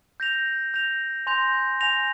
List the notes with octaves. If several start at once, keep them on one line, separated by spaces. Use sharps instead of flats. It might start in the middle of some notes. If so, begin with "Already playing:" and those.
G6 A#6 F7
G6 A#6 F7
G#5 C6 G6 A#6 F7
G#5 C6 G6 A#6 F7